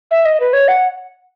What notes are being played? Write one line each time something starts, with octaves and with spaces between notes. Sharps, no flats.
E5
D#5
B4
C#5
F#5